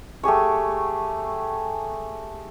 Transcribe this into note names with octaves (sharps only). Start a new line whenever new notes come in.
A3 G4 G#4 C#6